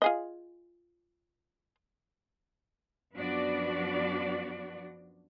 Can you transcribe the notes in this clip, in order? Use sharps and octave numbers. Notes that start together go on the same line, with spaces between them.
F4 G#4 D#5
F#2 F3 B3 D4 F#4 D5